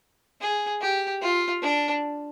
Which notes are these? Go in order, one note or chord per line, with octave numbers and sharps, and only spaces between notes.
G#4
G4
F4
D4